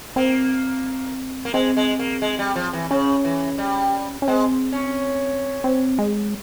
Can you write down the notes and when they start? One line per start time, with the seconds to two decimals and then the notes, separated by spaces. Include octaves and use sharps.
0.16 A#3 C4
1.45 A#3
1.54 G#3 C4
1.77 G#3
1.99 A#3
2.22 G#3
2.39 G3
2.56 F3
2.73 E3
2.91 C#3 C#4
3.25 E3
3.58 G3
4.22 C#4
4.28 G#3 C4
4.72 C#4
5.64 C4
5.99 G#3